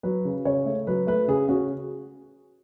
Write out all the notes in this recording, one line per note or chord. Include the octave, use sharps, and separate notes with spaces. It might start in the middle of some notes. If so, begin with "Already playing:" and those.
F#3 B4
C#3
C#3 C#5
A3
F#3 B4
A3 B4
C#3 G#4
C#4 F#4